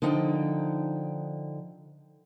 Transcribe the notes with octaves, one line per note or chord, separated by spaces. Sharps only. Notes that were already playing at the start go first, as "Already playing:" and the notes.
D3 F3 D#4 G5